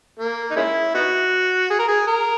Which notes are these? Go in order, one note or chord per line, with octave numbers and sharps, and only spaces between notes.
A#3
D#4
G#3 C#4 E4
B3 D#4 F#4
G#4
A#4
G#4
A#4